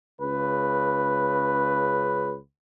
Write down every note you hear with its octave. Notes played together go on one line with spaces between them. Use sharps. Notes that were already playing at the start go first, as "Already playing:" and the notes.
C#2 C#3 B4